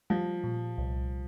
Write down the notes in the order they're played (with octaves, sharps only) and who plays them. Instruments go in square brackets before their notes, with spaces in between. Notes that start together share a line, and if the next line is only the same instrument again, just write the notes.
[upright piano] F3 [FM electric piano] G3
[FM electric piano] A#2
C2